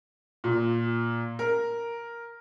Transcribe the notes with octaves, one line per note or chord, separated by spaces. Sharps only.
A#2
A#4